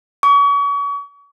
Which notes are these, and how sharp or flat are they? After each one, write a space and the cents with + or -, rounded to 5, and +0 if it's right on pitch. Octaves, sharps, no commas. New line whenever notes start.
C#6 +40